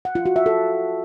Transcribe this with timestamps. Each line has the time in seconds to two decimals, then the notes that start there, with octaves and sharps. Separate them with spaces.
0.05 F#5
0.15 F4
0.26 F#4
0.36 E5
0.46 A4